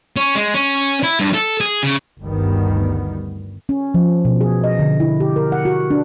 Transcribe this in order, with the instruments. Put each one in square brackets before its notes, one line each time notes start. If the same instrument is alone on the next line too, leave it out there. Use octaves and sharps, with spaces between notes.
[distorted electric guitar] C#4
G#3
C#4
E4
G2
A4
G#4
C#3
[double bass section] G1 D2 G2 D#3 G3 B3
[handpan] C#4
F3
B2
G#4
D#5
D3
E4
G4
A#4
F#5
F#4
D4